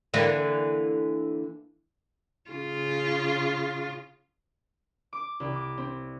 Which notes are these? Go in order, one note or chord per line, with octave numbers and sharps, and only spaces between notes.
D3 E3 A#3
C#3 F4
D6
C2
D6
C4